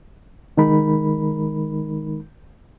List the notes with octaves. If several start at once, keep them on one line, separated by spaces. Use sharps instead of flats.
C2 D#3 G#3 D#4 A#4 B5